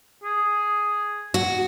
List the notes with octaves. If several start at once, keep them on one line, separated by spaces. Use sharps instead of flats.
G#4
F#4